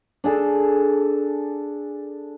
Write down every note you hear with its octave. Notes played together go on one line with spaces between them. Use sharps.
D4 G#4 A4